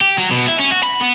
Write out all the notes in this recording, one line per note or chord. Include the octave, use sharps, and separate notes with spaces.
G4
F#3
B2
E4
C#4
F#4
B5
B3